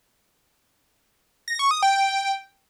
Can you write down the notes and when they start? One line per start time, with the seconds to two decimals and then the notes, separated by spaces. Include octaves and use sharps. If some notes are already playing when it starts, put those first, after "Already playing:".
1.48 A#6
1.59 C#6
1.71 D#6
1.83 G5